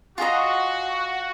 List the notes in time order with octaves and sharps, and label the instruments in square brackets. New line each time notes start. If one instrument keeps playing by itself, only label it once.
[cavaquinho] F4 G#4 D#5 A#5 [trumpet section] F#4